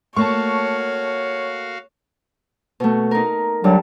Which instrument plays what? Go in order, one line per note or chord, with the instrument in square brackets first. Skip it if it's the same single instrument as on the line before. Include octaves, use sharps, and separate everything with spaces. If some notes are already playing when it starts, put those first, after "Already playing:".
[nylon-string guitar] A3 A#3 [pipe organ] F#4 F5 [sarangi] C#5 [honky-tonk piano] A5 C#6
[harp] B2 A3
D#4 A#4
[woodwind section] D3 F#3 [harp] G3 A5